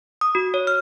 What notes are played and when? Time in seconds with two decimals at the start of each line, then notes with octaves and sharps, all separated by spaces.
0.21 D#6
0.35 F#4
0.54 C#5
0.67 F6